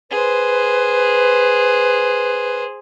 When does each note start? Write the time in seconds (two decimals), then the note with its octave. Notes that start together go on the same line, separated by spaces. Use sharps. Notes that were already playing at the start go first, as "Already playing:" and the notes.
0.11 G#4 B4 C5